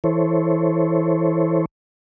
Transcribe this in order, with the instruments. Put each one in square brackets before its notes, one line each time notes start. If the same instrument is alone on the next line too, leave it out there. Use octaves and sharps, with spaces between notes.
[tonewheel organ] E3 E4 A4 C5 C#5